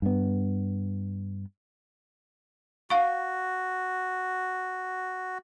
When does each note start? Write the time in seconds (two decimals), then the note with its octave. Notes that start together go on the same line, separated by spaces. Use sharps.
0.02 G2 B3
2.90 F#4 F5 C#6